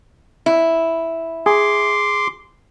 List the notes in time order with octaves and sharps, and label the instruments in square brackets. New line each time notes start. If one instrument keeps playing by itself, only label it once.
[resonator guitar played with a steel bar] E4
[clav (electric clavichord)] G#4 [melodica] C6 D6